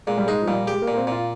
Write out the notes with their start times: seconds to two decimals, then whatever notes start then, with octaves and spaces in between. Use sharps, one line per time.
0.07 A#2 G#3
0.18 G3
0.27 G#3 D#4
0.42 F3
0.48 A#2 G3
0.67 G#3 G4
0.82 A#3
0.88 A#2
0.93 A#3
0.97 C4
1.07 A#2 F4